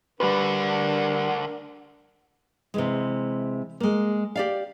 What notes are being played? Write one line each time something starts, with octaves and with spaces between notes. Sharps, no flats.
D2 D3 G3 D4 A#4 B4
C3 E3 G#3
G#3 A#3
G4 D5 F5